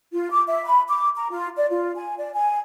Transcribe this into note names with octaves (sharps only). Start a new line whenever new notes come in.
F4
D6
E5
B5
D6
A#5
F4
D5
F4
G#5
D5
G#5